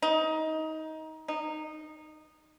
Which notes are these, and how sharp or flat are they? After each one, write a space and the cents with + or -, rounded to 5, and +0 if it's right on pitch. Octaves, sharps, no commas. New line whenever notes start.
D#4 +20
D#4 -15